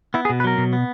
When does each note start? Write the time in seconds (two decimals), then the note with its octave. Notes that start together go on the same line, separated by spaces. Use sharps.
0.14 B3 E4
0.25 G#4
0.30 B2
0.40 B4
0.44 F#3 A#4
0.58 B2
0.73 B3